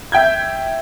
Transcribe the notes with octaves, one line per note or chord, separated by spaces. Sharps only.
E5 G5 G6 G#6